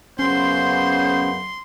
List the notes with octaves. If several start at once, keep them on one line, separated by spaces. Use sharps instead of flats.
F#2 C#3 B3 C#4 C5 C6